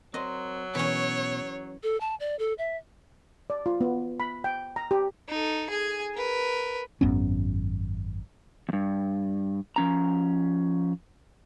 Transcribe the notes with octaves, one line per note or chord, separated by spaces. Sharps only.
F#3 C4 A#4 C5 D#5
B2 E3 C#4 C#5
A4
A5
D5
A4
E5
D5
F4
B3
B5
G5
A#5
G4
D#4 A4
G#4 G#5
A#4 B4
G#1 F#2 B3 C#4
E2 G2
F3 C#4 A#5